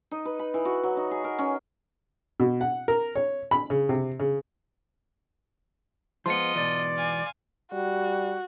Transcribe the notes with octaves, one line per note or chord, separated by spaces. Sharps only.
D#4
B4
B5
E3
F#4
F#3
D#4
G#4
A#4
C#4
B2
F#5
A#4
C#5
B5
C#3
C3
C#3
F3 G#3 B3 F4 D#5 C6 C#7
E2 G#2 B2 D5
F5 G#5
G3 F#4